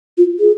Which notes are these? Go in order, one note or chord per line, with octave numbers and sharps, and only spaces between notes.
F4
G#4